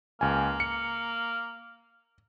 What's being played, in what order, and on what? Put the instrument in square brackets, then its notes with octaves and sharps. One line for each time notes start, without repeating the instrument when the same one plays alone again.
[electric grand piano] C#2 G#5 [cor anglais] A#3
[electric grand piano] C#7